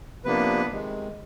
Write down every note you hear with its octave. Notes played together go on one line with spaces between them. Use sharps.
C3 F3 A#3 B3 D4 B4
C3 D#3 G#3